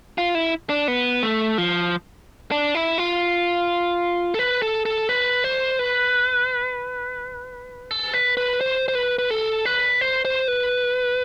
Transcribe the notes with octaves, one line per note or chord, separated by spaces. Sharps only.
F4
E4
D4
B3
A3
F3
D4
E4
F4
A4
B4
A4
A4
B4
C5
B4
A4
B4
B4
C5
C5
B4
B4
A4
B4
C5
C5
B4